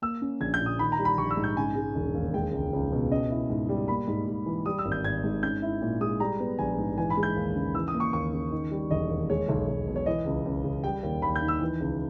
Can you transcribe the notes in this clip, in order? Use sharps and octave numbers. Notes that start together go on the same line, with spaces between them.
A#3 E6
C#4
A#1 G#6
G6
A#2
D#6
D#3 B5
A#5
G3
B5
A#1 C#6
E6
G#2
G6
C#3 G#5
G#3
E1
D#2
G#3 G5
C#2
C#2
B2
C#4 D#5
E4
G#2
G3
A#3 B5
G#2
G#2
E3
G3 D#6
E6
G#1
G6
G#1 G#6
G#2
C#4 G6
E4
A#2
G#3 D#6
G3 A#5
B3
A#1 G#5
G#2
E3 G#5
B5
G#3
G6
D#2
C#3
E3 E6
D#6
A#3
C#6
D#2 C#6
C#3
D#3
G3
E1 D#5
D#2
G#3 C#5
B1
B1
B2
C#5
E3 D#5
C#2
C#2
C#3
G3 G5
D#2
D#2 B5
G6
D#3
E6
E3
C#2